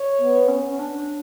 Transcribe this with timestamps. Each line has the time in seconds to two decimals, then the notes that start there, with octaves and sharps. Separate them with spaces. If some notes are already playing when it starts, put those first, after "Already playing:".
Already playing: C#5
0.19 B3
0.48 C#4
0.69 C#4
0.79 D4